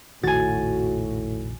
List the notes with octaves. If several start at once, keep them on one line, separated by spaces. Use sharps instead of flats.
F1 A#1 A2 D#3 F#4 G#5 A6